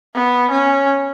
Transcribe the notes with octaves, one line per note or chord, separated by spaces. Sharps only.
B3
C#4